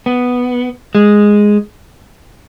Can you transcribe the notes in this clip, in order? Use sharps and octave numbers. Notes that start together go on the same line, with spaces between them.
B3
G#3